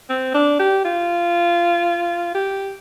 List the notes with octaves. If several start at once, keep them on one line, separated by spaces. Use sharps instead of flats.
C4
D4
G4
F4
G4